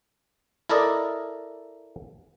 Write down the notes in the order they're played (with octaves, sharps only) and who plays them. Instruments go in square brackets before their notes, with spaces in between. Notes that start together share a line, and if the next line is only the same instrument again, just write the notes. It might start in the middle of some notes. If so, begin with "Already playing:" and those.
[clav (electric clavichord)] E4 A4 A#4 D5 D#5